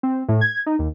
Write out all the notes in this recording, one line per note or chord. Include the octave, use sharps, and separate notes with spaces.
C4
A2
G#6
D#4
D#2